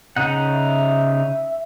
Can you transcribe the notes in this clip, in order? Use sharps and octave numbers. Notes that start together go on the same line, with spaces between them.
C#3 D#4 F#5
E5